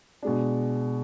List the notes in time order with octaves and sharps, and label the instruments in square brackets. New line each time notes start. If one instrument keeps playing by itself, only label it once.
[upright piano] B2 G#3 D4